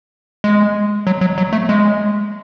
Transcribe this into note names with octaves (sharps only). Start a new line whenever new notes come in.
G#3
F#3
F#3
F#3
A3
G#3